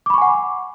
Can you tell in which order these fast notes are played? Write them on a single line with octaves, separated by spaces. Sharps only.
D6 B5 C#6 G#5 F#5